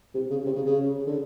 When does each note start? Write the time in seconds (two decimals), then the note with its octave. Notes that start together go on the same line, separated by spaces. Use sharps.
0.14 C3
0.30 C#3
0.45 C3
0.56 C#3
0.66 C#3
1.07 D3